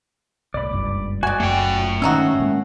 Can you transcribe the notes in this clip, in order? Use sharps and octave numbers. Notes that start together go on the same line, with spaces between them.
C2 A2 D5 B5
F#1 C#2 G2
G#3 F#4 D5 G#5
F#1 F#2 A3 G5
G#2 D3 D#3 C#4 D#4 F#4 E6
A2 G#3 A#3